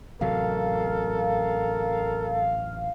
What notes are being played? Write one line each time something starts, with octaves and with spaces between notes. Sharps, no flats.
A1 C3 F#3 A4 A#4 F5